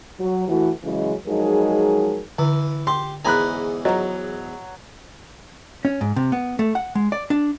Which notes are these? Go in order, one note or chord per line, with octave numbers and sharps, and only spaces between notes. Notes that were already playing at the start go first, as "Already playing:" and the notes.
F#3
E3 A3 F#4
C#3 E3 F#3 G#3
F3 F#3 G#3 D#4 G#4 A#4
D3 E3
G4 C6
E2 G#2 G#5 A#5 B5 F#6
F#3 D#5 A#5
C#4
G#2
C3
B3
A3
F#5
G#3
D5
D4